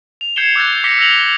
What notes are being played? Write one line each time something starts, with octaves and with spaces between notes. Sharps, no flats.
F7
G6 G#6 C7 C#7 E7 G7
D6 E6 F#6 G6 A6
D6 A#6 B6 C#7 G7
E6 A#6 F7 F#7